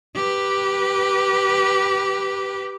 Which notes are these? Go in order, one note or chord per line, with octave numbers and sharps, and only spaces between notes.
G4 B4